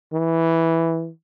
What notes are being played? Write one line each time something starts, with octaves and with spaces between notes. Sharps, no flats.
E3